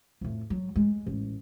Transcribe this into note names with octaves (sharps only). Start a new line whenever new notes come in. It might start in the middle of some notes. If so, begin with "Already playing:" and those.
F2 A2
F#3
G#3
A1